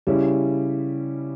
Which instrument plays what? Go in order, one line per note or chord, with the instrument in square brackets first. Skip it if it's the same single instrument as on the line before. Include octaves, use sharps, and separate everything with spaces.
[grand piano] C#3 G3 C#4 E4